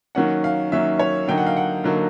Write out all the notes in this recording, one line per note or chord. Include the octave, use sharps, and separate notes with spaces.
D#3 F#3 A#3 C#4 F#5
F5
D#3 F#3 A#3 C#4 E5
C#5
D3 F#3 A#3 D#4 G5
F#5
F5
F#5
D3 F#3 A#3 D#4